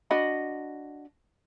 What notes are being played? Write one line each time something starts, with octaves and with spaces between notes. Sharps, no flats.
D4 F#4 D#5 B5